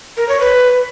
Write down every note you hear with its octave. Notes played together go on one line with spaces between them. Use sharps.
A#4
C#5
B4